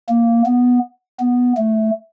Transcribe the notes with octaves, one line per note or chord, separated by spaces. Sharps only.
A#3
B3
B3
A3